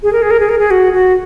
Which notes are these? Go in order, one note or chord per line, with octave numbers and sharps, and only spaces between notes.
G#4
A#4
G#4
A#4
G#4
A#4
G#4
F#4
F#4